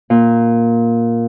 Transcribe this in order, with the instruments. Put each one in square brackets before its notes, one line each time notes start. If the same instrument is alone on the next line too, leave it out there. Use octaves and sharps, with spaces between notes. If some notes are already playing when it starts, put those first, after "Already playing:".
[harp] A#2